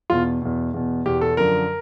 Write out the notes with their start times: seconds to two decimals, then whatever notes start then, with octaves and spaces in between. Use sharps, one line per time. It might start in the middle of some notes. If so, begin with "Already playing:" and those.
0.10 E2 B2 F4
0.42 E2 B2
0.74 E2 B2
1.06 E2 B2 G4
1.21 A4
1.37 F#2 D3 F3 A#4